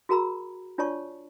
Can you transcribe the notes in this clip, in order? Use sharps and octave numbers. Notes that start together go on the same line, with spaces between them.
F#4 G#4 A#4 A#5 B5 E6
D4 F4 C#5 D5 A5 C#6